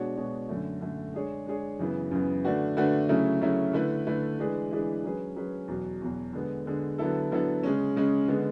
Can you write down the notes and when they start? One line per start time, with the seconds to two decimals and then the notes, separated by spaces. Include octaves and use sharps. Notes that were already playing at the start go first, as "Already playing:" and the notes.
Already playing: B2 G#3 D4 F#4 C#5
0.16 B2 G#3 D4 F#4 C#5
0.49 F#2 D3 A3
0.81 F#2 D3 A3
1.14 G#3 D4 G#4 C#5
1.46 G#3 D4 G#4 C#5
1.79 F#2 C#3 E3 B3
2.11 F#2 C#3 E3 B3
2.44 D3 A3 D4 F#4 B4
2.77 D3 A3 D4 F#4 B4
3.09 C#3 F#3 A3 C#4 E4
3.41 C#3 F#3 A3 C#4 E4
3.73 D3 A3 E4 B4
4.07 D3 A3 E4 B4
4.38 E3 G#3 D4 G#4 B4
4.71 E3 G#3 D4 G#4 B4
5.04 F#3 C#4 G#4 B4
5.36 F#3 C#4 G#4 B4
5.68 E2 B2 F#3
6.02 E2 B2 F#3
6.33 D3 G#3 B3
6.66 D3 G#3 B3
6.98 D3 F#3 B3 E4 A4
7.32 D3 F#3 B3 E4 A4
7.63 C#3 G#3 C#4
7.96 C#3 G#3 C#4
8.28 D3 G#3 B3